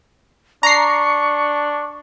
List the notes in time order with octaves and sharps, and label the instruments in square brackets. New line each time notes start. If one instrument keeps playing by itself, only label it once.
[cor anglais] D4 [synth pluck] A#5 C7 [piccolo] C#6